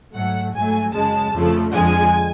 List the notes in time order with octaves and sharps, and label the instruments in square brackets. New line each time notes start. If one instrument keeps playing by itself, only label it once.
[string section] G#2 F#3 A3 F#5
G#2 F#3 A3 G#5
F#2 C#3 G#3 A5
F2 C#3 F3 A3
F2 D3 F3 G#3 G#5